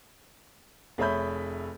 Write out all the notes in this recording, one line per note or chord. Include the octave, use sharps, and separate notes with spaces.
F1 G#4 C#5 E5 B5 G6